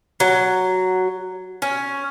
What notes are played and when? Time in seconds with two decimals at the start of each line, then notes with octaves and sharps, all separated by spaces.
0.20 F#3
1.62 C#4